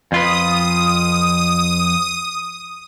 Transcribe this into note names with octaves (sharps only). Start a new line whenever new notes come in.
F2 F4 B4 D#6